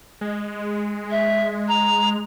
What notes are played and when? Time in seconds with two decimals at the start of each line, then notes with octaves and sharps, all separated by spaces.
0.21 G#3
1.10 E5
1.68 A#5